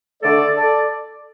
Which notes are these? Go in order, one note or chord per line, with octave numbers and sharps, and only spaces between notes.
D3 A3 A4 D5
A4 D5